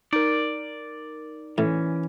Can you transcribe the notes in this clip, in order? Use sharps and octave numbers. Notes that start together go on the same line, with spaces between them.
D#4 A#4 D5
A2 E3 C#4